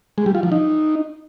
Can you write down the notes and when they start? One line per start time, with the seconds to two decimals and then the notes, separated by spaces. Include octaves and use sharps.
0.18 G#3
0.26 G3
0.35 F4
0.43 F3
0.52 D#4